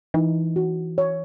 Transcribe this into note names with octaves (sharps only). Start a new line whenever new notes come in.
E3 D#4
F#4
C#5